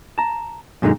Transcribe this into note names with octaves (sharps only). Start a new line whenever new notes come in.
A5 A#5
F#2 A#2 D3 G#3 D#4